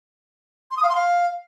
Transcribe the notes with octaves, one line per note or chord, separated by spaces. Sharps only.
C6
D#6
F5
C6
F5